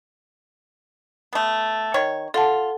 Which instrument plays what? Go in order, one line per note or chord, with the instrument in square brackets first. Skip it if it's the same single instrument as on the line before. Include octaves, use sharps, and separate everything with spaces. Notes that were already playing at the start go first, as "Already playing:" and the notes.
[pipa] A3 B3
D#3 C#5
[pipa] F4 [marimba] A4 F#5 A5